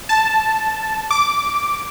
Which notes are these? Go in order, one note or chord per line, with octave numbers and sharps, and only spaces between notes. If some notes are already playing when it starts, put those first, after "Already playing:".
A5
D6